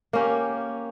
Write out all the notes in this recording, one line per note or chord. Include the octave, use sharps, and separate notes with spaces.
A#3 C#4 G4